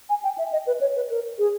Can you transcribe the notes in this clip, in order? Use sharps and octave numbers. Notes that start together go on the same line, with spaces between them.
G#5
G5
E5
D#5
B4
C#5
B4
A#4
G#4